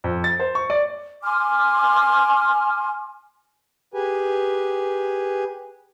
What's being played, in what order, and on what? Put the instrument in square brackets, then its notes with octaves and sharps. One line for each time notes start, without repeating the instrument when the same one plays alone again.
[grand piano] F2
A6
C5
C#6
D5
[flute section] G#5 C6 D6 F6
[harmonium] G4 G#4 B4 G#5